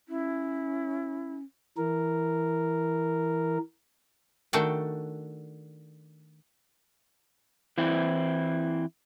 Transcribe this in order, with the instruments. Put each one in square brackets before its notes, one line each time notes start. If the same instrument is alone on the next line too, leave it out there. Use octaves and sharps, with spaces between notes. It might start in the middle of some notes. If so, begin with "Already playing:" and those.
[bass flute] C#4 [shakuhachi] E4
[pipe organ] E3 A#4
[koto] D#3 A3 D4 F#4 D5 G5
[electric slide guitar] E3 C4 E4